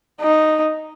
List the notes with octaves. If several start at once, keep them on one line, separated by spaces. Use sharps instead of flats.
D#4